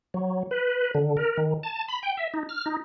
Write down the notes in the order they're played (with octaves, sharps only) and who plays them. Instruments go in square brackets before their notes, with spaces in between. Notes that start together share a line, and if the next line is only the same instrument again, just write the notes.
[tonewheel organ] F#3
B4
D3
A#4
D#3
A5
B5
G5
E5
D#4
F6
D#4